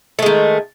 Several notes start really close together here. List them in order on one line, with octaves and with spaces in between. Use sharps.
A3 G#3 D#3